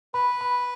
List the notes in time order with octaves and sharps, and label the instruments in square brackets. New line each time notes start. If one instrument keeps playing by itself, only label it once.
[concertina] B4 [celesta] B5
[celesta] B5